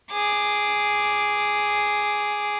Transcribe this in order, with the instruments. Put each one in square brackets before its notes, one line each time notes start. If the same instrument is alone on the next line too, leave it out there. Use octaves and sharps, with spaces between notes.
[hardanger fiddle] G#4 D6